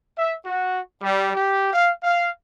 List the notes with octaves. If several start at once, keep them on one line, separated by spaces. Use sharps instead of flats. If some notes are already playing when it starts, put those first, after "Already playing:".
E5
F#4
G3
G4
F5
F5